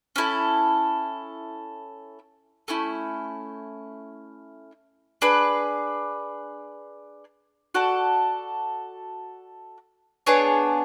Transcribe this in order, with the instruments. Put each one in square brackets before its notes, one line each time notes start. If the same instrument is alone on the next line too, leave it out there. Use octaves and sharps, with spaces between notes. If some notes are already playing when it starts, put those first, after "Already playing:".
[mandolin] C#4 E4 A4
A3 C#4 E4
D4 G#4 B4
F#4 A4 D5
B3 D4 G#4 C#5